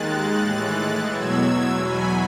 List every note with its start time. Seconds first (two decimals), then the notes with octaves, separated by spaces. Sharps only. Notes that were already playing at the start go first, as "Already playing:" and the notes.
Already playing: D#2 D#3 G#3 F#6 A6
0.41 A2 E3 G#3
1.11 E2 B2 F#3 E6 G#6
1.81 E2 B2 F#3 G#5 B5